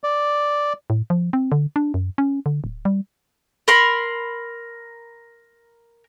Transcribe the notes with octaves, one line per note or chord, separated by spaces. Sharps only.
D5
A2
F3
C4
D3
D4
F#2
C#4
D3
D1
G3
A#4 B5 C6